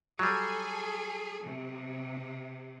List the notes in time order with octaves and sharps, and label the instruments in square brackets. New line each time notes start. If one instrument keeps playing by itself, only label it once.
[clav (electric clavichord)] F#3 G3 [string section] G#4 A4 G#5
[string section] C3